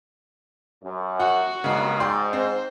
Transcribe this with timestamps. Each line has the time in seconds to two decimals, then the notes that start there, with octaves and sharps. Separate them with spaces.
0.84 F#2
1.20 F#4 F#5
1.64 G2 C#3 G#3 A#3 B3 D#4
2.00 G#2 D5 G5 C6
2.33 C4 C5